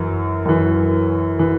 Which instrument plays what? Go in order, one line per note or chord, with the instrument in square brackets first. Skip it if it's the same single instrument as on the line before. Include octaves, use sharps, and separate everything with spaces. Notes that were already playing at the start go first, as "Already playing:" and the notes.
Already playing: [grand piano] F#2 E3
F#2 E3
E3